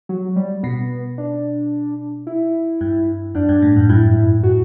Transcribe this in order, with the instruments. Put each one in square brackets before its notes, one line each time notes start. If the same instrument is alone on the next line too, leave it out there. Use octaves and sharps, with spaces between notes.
[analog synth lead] F#3
G3
[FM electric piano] B2 [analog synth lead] B3
[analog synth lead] D4
E4
[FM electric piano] G2
[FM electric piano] F#2 [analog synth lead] D4
[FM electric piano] G2
A2
F#2
[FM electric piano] G2 [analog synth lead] E4
[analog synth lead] F#4